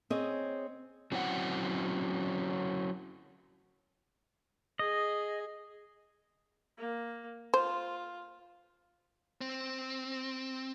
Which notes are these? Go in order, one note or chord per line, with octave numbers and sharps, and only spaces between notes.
C4 G#4 C#5 D#5
F#3 C4 C#4 E4 C5 F#5
G#4 D#5
A#3
F4 C5
C4